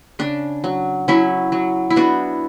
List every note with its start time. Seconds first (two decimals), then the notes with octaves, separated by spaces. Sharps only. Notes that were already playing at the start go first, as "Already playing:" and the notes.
0.19 C#3 D4
0.64 F#3
1.08 F#3 C#4 E4
1.52 F#3
1.90 E4
1.96 B3 D4 F#4